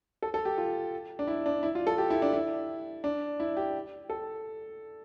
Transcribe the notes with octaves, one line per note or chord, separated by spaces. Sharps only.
A4
A4
G4
F4
D4
E4
D4
E4
F4
A4
G4
E4
D4
E4
D4
E4
G4
A4